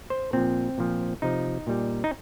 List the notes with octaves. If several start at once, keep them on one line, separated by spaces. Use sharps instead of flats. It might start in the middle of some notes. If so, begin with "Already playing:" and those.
C5
A#2 F3 C4
A#2 F3
C3 F3 D#4
A#2 G3
D#4